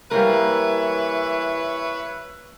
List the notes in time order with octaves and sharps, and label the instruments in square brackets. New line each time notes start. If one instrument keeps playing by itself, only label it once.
[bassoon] E3 [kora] G3 A#3 A#4 [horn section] B4 C#5 E5